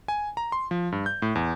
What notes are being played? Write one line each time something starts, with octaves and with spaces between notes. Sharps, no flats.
G#5
A#5
C6
F3
G2
G6
A2
E2